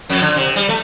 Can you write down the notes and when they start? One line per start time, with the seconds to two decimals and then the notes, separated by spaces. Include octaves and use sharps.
0.09 F2
0.21 D3
0.37 C3
0.56 G3
0.69 A3